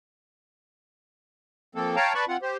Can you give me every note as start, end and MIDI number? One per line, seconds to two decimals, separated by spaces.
1.75 1.96 53
1.75 1.96 58
1.75 1.96 60
1.75 1.96 69
1.96 2.13 73
1.96 2.13 77
1.96 2.13 79
1.96 2.13 81
1.96 2.13 82
2.14 2.25 71
2.14 2.25 74
2.14 2.25 81
2.14 2.25 83
2.14 2.25 85
2.28 2.37 60
2.28 2.37 65
2.28 2.37 78
2.42 2.57 67
2.42 2.57 72